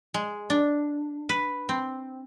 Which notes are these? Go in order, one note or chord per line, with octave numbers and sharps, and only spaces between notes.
G#3
D4
B4
C4